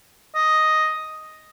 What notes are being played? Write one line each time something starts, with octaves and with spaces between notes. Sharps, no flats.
D#5